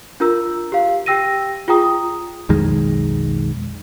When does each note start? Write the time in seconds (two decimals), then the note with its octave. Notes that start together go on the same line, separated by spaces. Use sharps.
0.20 D4 F4 A#4 A#5 E6
0.72 G4 F5
1.06 G4 G5 E6 A#6 D#7
1.68 F4 G#4 G5 A#5 D#6
2.49 B1 F2 D#3 G#3